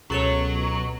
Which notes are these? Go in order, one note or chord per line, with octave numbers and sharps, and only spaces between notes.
C#2 B2 F#3 A4 C#5